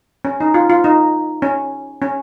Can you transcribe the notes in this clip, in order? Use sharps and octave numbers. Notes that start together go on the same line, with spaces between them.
C#4
D#4
F4
F4
D#4
C#4
C#4